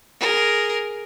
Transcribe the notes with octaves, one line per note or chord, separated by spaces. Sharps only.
G#4 A#4